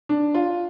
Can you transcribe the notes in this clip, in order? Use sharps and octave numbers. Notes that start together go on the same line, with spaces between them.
D4
F4